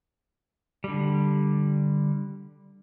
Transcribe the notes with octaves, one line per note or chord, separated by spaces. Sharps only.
D3 G3